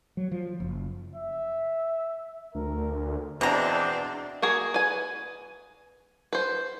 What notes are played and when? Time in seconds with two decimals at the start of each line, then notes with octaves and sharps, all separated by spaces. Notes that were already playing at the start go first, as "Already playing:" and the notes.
0.17 F#3
0.32 F3
0.60 F#1
1.16 E5
2.55 D2 A#4
3.41 E2 B2 C4 D4 A#5
4.42 A#3 F#4 G#4
4.74 B4 G#5
6.33 B4 C5